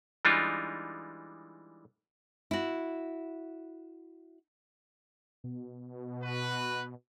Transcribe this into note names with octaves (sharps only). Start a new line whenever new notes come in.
E3 G3 G#3 D4 D#4 F4
E4 F#4
B2
F#4 B4